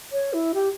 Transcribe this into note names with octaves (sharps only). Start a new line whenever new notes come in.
C#5
E4
G4